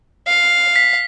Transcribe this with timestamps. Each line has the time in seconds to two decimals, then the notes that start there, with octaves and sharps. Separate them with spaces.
0.27 F5
0.76 B6